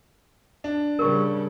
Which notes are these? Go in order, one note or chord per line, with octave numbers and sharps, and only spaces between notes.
D4
C#3 G3 A#4 C#6